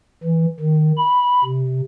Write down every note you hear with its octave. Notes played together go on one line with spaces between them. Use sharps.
E3
D#3
B5
C3